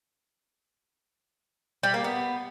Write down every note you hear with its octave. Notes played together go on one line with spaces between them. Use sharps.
G3
A#3
B3